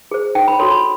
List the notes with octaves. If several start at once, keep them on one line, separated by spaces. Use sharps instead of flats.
G#4 C5
D#4 G5
B5
F#4 A4 C#5 C6
B5